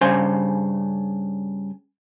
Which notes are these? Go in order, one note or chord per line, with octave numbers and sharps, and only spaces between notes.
G2 C#3 C5 G#5 C6